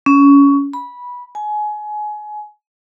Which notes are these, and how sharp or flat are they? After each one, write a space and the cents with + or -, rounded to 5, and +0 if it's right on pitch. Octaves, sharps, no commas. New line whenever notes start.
C#4 +20
B5 -15
G#5 +25